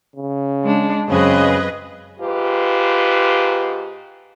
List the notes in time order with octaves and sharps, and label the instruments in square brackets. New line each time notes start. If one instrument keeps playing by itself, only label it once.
[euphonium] C#3
[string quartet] G#3 D4
[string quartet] F#2 C4 [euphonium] C#3 [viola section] G#4 B4 D#5
[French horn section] G#2 F4 G4 B4